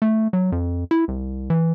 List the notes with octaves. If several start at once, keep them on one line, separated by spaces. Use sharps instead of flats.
A3
F#3
F2
E4
C2
E3